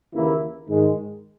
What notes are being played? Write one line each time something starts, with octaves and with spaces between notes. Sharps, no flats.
D#2 C#3 E3 A#3 E4
G#2 D#3 G#3